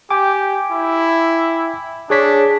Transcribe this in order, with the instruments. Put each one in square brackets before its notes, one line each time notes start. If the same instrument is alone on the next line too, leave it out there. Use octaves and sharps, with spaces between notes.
[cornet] G4 [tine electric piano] G5 G#5 D6
[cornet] E4
[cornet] D4 [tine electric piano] G#4 C#5 B6